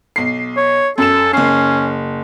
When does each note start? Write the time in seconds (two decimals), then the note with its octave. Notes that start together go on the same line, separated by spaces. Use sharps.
0.16 B1 C7
0.57 C#5
0.98 F#2 A4 E7
1.33 F#1 C#4 C7